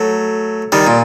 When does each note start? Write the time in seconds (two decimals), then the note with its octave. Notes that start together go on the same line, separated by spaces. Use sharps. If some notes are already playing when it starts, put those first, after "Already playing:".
Already playing: F#3 A3
0.72 D#3 G3
0.87 A#2